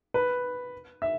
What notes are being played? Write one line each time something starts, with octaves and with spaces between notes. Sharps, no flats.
B4
E5